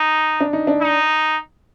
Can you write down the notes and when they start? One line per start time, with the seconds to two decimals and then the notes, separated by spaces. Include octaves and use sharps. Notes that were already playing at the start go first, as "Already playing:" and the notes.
Already playing: D#4
0.40 D4
0.53 D#4
0.67 D4
0.81 D#4